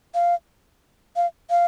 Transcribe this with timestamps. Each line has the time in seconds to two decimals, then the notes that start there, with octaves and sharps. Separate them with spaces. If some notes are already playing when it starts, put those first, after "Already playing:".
0.15 F5
1.16 F5
1.50 F5